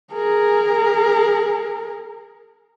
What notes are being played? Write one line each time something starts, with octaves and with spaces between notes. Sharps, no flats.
G#4 A#4